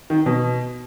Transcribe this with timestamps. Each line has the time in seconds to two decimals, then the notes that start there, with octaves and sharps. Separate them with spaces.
0.10 D#3
0.26 B2